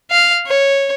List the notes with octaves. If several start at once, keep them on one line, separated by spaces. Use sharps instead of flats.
F5
C#5